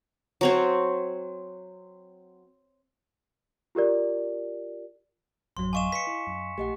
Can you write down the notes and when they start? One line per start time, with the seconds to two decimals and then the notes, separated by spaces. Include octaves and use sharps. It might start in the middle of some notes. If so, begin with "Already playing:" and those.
0.41 F#3 C4 C#5
3.75 F4 G4 A#4 D5
5.57 A1 F#2 F#3 C6
5.73 D#5 F5 G#5 C#6 D6 E7
5.92 B4 B6 C#7
6.07 E4
6.27 F#2
6.58 A#1 A3 G4 D#5 F#5